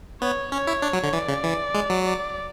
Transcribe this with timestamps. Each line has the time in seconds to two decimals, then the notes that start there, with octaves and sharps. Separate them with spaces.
0.21 B3 C#5
0.52 C#4 C#5
0.67 E4
0.82 D4
0.93 F#3
1.03 D3
1.13 E3 D5
1.28 C#3
1.44 E3
1.75 G#3
1.90 F#3
2.05 D5